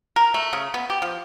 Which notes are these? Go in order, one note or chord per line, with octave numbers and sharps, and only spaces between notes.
A#4
A3
C#3
B3
G4
F3